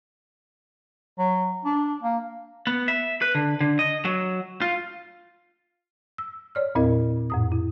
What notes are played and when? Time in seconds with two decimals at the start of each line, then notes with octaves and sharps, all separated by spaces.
1.19 F#3
1.65 D4
2.02 A#3
2.67 B3
2.88 E5
3.22 B4
3.35 D3
3.60 D3
3.79 D#5
4.05 F#3
4.61 F4
6.18 E6
6.55 C#5 D5 F6
6.75 E2 A#2 C4 E4 A#4 D#5
7.30 F2 A2 D#6
7.52 E4